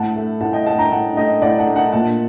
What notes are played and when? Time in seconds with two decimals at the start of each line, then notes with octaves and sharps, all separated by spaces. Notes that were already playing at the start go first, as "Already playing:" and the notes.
Already playing: A2 F#5 A5
0.16 A3
0.41 A2 F#5 A5
0.53 D#5 G5
0.66 A3 F#5 A5
0.79 G5 A#5
0.92 A2 F#5 A5
1.17 A3 D#5 G5
1.41 A2 D5 F#5
1.58 F#5 A5
1.67 A3
1.76 F#5 A5
1.92 A#2 F#5 A5